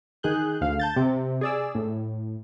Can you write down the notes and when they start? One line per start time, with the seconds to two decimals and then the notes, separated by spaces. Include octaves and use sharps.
0.23 D#3 G#4 F#6 G6
0.61 D2 F5
0.80 A5 G6 A6
0.96 C3
1.41 G#4 D5 E6
1.75 A2